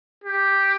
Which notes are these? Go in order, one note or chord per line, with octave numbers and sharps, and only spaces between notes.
G4